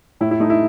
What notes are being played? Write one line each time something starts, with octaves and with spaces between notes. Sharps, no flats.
A2 E4
E4
A3 D#4
E4